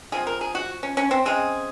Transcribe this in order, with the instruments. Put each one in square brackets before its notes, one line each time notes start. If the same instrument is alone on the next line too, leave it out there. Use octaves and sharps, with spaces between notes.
[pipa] F3 C4 G#4
A#4
G#4
F#4
C#4
C#4
C4
C#3 G#3 C4 G#4